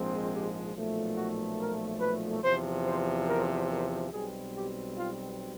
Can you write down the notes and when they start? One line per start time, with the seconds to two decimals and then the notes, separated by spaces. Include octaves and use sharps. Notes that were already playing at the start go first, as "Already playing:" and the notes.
Already playing: A#1 G#2 F3 G#3 C4
0.31 G4
0.74 B1 A#2 F3 A3
1.16 F#4
1.59 A#4
2.01 B4
2.43 E2 C3 F3 C5
2.85 C5
3.28 A#4
3.70 A#4
4.12 B1 B2 G3 C4 G#4
4.54 G4
4.96 F4